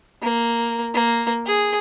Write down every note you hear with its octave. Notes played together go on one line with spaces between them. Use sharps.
A#3
A#3
G#4